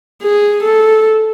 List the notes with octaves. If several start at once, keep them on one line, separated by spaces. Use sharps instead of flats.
G#4
A4